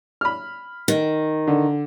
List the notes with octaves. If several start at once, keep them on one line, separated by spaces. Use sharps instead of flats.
B5 F6
D#3
D3